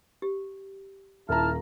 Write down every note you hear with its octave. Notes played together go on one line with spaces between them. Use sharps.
G4
D#1 E4 A5 A#5 F6